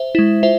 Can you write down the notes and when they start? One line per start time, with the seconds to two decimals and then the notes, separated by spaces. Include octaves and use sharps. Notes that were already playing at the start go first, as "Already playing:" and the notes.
Already playing: C5 E5
0.15 G#3 E4
0.43 F4 C5 E5